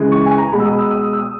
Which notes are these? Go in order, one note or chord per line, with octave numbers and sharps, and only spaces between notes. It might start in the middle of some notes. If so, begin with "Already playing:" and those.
Already playing: C#3 E3 G#3
C#6
G#5
A#5
B2 G#3 B5
E6
D#6
E6
D#6
E6
D#6